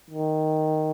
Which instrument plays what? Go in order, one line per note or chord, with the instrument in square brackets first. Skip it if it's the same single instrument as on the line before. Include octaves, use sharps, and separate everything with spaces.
[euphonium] D#3